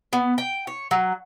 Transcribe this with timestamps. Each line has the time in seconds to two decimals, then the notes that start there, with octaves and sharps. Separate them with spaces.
0.13 B3
0.38 G5
0.67 C#5
0.91 F#3